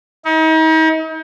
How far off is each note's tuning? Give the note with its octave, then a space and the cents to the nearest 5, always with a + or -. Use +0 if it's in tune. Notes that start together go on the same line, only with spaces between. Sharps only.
D#4 +40